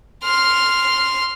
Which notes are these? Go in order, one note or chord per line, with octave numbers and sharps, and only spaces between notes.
C6 F6